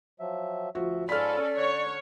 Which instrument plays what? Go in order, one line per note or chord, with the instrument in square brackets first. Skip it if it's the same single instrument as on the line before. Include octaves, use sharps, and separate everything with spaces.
[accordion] F3 F#3 E5
[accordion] D2 E5 [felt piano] F3 F#4
[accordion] G#2 F4 B5 [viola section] C#4 A4 [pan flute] D5 [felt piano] F6 B6
[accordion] D3 F#6 [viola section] C#5